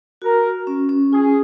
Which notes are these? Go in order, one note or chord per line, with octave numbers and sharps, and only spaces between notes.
F#4 A#4
F#4
C#4
C#4
F4 G#4